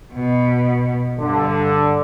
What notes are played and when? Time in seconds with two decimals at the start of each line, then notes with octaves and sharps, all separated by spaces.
0.13 B2
1.19 G2 D3